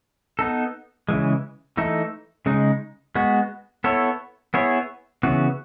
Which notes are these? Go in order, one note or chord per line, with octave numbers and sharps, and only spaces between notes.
B3 D#4 A4
C#3 E3 G#3
E3 A3 D#4 A4
C#3 G#3 D#4
G#3 B3 F#4
B3 E4 A4 C#5
B3 E4 G#4 C#5
C#3 E3 B3 F#4